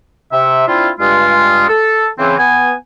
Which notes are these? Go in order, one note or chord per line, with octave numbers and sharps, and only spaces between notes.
C3 E5
C4 D4 E4 F4
G2 G#3 F4
A4
C#3 E3 C4
B3 G#5